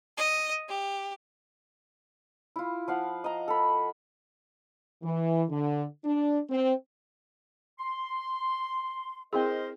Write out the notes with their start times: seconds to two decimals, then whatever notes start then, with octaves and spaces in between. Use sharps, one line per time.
0.17 D#5
0.68 G4
2.56 E4 F4
2.88 F3 F5 F#5
3.24 D#5 A#5
3.48 A4 B5
5.03 E3
5.50 D3
6.04 D4
6.50 C4
7.79 C6
9.33 C4 E4 G#4 A#4 C5 D#5